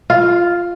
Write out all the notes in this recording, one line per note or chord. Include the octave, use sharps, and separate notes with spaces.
F4